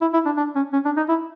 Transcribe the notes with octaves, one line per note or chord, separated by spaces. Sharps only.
E4
E4
D4
D4
C#4
C#4
D4
D#4
E4